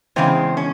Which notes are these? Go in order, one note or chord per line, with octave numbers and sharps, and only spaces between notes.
E2 C#3 G#3 C4
C#4